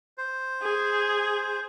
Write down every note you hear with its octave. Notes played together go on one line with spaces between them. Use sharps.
C5
G#4